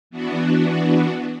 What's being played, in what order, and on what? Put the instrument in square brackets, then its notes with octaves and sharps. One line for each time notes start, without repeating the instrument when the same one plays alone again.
[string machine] E3 B3 D4 F#4